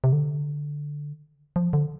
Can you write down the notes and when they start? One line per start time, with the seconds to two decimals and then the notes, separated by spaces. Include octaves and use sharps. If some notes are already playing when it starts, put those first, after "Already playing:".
0.04 C3
0.13 D3
1.56 F3
1.73 D3